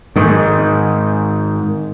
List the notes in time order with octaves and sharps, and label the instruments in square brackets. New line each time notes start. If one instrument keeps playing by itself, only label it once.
[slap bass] G#2 D#3